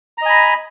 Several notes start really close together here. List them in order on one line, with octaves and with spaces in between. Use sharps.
A#5 D#5 G#5 B5